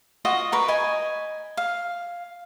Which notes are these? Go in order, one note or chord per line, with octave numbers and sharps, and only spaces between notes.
F4 F#4 D#5 F#5
A#4 B4 C#6
D#5 G#5
F5